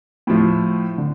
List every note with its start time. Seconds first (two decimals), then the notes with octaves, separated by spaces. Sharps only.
0.27 A2 F3 A3
0.98 D3